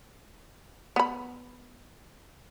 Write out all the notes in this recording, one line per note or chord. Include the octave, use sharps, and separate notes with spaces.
B3 B5